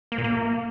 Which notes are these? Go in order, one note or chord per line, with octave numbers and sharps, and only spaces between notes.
A#3
A#2
A#3